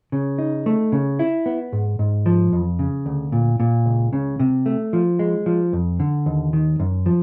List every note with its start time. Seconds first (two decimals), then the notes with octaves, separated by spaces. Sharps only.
0.12 C#3
0.38 D#4
0.66 A3
0.92 C#3
1.19 E4
1.46 B3
1.73 G#2
1.99 G#2
2.26 F3
2.53 F2
2.79 C#3
3.06 D2
3.32 A#2
3.60 A#2
3.86 C#2
4.13 C#3
4.40 C3
4.66 A3
4.93 F3
5.19 G#3
5.46 F3
5.73 F2
6.00 D3
6.26 D#2
6.53 D#3
6.80 F#2
7.06 F3